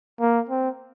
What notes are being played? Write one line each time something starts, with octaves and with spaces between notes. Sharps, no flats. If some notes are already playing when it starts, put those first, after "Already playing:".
A#3
C4